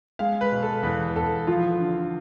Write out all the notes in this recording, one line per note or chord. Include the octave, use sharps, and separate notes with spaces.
G#3 F5
B4
B2
A4
E2 B4
E2 A4
F3 F4
D3